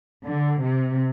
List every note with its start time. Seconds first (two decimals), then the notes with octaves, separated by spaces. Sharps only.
0.24 D3
0.63 C3